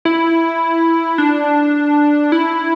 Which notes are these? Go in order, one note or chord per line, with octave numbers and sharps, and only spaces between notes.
E4
D4
E4